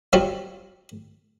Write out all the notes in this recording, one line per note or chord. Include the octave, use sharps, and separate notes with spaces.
F#3 G3 C4 F4 F#4